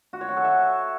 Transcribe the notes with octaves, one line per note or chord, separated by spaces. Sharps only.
F#4
C#5
F#5
A4
E5